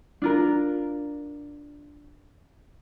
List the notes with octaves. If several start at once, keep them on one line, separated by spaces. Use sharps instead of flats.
D4 F4 A#4